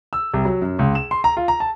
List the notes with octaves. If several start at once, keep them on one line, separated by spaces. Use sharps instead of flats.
E6
C2
F#3
F#2
C#2
E7
C6
A#5
F4
A#5
A5